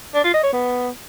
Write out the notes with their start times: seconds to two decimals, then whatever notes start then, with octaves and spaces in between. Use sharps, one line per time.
0.15 D4
0.24 F4
0.34 D#5
0.43 C#5
0.53 B3